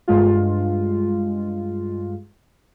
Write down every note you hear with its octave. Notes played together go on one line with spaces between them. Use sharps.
G2 G#3 F4